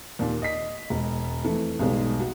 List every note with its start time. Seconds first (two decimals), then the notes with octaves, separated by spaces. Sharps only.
0.19 D#2 A#2
0.42 D#5 B6
0.90 E1 G#3
1.44 F2 E3 A3
1.79 B1 G#2 B2 G3 G#3
2.20 F#4